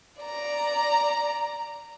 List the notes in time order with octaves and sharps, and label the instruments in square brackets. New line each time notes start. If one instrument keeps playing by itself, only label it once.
[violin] D5 A#5